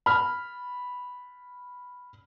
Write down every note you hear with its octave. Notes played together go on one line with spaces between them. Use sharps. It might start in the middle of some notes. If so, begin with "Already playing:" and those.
B5 F6